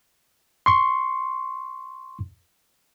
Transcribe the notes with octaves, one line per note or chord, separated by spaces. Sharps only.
C6 C#6